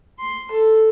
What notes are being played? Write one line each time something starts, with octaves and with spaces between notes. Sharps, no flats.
C6
A4